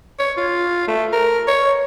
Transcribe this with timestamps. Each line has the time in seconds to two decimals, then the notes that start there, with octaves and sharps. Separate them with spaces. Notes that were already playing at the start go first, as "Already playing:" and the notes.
0.19 C#5
0.37 F4
0.88 A3
1.12 A#4
1.47 C#5